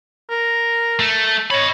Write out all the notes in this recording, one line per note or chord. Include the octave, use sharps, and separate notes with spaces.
A#4
A3
C#5 D#5 B5